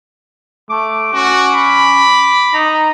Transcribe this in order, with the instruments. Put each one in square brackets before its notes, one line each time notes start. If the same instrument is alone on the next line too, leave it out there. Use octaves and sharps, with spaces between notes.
[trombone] A3 [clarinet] D6
[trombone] C#4 [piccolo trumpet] F#4
[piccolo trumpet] B5
[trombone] D#4 [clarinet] A#5